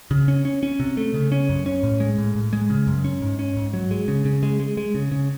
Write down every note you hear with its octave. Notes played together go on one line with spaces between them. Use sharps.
C#3
C#4
C#4
C#4
C3
A3
C#3
C#4
F#2
C#4
A2
G#3
A2
A2
G#3
C#3
F#2
C#4
G#2
C#4
G#2
F#3
G#3
C#3
C#3
G#3
G#3
G#3
C#3
C#3